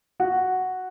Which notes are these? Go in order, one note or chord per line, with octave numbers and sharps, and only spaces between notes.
F#4 F#5